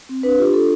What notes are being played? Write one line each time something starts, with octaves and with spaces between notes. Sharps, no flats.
C4
D4 B4
F4 G4
D4 A4